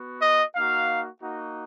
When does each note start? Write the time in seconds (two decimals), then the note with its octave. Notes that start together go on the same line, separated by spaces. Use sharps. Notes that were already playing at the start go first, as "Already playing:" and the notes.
Already playing: B3 F#4
0.22 D#5
0.56 A#3 D#4 F#4 F5
1.22 A#3 D#4 F#4